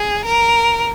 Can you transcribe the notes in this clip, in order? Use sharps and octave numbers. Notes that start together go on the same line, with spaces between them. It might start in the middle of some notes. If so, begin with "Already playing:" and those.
Already playing: G#4
A#4